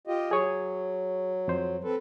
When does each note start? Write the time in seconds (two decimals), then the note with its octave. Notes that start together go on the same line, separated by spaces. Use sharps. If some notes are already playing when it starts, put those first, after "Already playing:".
0.07 F4 G4 D#5
0.31 F#3 G#4 C#5
1.48 F2 C5
1.84 C4 A4 B4